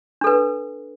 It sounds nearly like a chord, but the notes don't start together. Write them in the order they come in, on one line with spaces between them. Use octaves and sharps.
D4 A4 B4